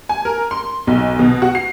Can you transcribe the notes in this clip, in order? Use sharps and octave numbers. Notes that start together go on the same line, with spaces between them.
G#5
A#4
C6
B1
B2
F#4
C7